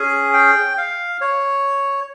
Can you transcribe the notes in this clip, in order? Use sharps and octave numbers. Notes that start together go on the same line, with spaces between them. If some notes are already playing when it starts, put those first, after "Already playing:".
Already playing: C#4 G#4 G#5
G5
F5
C#5